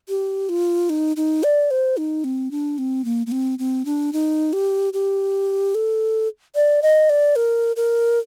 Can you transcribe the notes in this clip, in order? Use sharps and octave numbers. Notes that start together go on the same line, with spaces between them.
G4
F4
D#4
D#4
D5
C5
D#4
C4
D4
C4
A#3
A#3
C4
C4
D4
D#4
G4
G4
A4
D5
D#5
D5
A#4
A#4